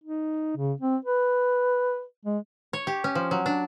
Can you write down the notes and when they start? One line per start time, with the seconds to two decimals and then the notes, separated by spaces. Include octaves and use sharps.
0.04 D#4
0.56 C#3
0.80 C4
1.05 B4
2.25 G#3
2.73 C#5
2.87 G4
3.04 C#4
3.15 F3
3.31 F#3
3.46 D4